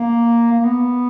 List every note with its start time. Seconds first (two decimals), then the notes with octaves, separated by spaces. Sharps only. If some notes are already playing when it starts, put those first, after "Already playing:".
Already playing: A#3
0.52 A#3
0.64 B3